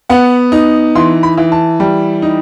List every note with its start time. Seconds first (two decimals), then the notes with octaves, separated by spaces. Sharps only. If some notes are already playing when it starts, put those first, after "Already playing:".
0.09 B3 F#5
0.52 D#4
0.95 E3 C6
1.23 B5
1.37 E3
1.52 A5
1.80 G3
2.22 D#4